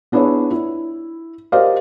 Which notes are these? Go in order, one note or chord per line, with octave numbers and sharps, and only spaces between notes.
B3 D4 E4 G#4 B4 C#5
E4
G4 A#4 C5 D5 D#5 F5